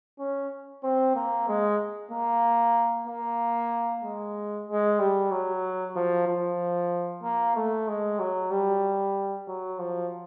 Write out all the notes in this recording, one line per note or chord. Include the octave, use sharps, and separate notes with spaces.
C#4
C4
A#3
G#3
A#3
A#3
G#3
G#3
G3
F#3
F3
F3
A#3
A3
G#3
F#3
G3
F#3
F3